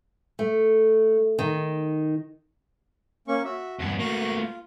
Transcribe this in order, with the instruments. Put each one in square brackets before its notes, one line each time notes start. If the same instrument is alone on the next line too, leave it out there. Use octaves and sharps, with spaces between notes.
[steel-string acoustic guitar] A3
D#3
[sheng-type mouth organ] A#3 C#4 C#6
F#4 E5
[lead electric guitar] E2 G2 [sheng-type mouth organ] F#5 A5
[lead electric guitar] A3 A#3 [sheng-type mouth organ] F#4 C#6 F#6
[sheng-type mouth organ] F4